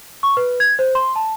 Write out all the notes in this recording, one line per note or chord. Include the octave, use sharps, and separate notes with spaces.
C#6
B4
G#6
C5
C6
A5